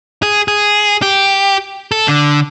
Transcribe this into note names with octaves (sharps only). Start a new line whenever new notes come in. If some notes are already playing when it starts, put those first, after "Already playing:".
G#4
G#4
G4
A4
D3